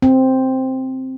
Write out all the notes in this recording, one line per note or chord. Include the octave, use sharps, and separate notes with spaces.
C4